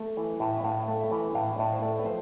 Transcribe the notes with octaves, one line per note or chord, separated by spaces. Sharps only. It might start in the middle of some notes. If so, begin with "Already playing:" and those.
Already playing: A3
E3
A2
E5
A2 F5
A3
E5
E3
A2 F5
A2 D5
C5
A3 D5
B4
F3 C5